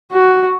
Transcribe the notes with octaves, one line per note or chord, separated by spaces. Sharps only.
F#4